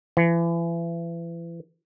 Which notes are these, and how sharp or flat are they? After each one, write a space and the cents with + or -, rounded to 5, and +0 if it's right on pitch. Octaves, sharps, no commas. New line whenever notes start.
E3 +35